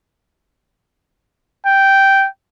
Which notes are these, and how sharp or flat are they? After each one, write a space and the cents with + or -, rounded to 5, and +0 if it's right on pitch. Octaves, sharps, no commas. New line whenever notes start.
G5 -5